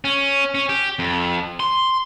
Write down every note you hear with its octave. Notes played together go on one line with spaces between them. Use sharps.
C#4
C#4
G4
F2
C6